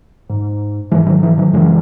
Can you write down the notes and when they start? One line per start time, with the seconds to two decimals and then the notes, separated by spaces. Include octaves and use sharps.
0.30 G#2
0.91 G#2 E3 G#3
1.06 D#3 F#3
1.23 E3
1.37 D#3 F#3
1.53 F#2 C#3 E3 G#3